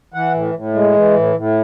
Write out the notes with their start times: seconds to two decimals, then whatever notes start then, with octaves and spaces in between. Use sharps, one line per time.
0.14 E3 F#5
0.34 A2
0.55 A2
0.74 G#3
0.95 E3
1.15 A2
1.36 A2